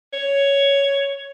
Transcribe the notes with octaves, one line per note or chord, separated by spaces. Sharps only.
C#5